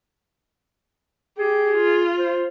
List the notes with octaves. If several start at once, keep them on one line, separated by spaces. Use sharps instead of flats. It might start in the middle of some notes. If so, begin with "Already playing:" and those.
G4 G#4
F4
C5